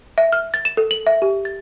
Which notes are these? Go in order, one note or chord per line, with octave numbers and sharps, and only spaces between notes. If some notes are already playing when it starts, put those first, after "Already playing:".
E5
F6
A6
E7
A4
F#7
E5
G4
A6